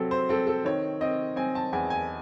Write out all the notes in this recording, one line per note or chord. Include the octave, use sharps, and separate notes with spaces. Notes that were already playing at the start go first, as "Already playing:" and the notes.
Already playing: C3 F#3 C4 A4
C5
C4 A4
A4
D#3 C#5
C4 D#5
C4 G#5
A5
E2 G#5
G#5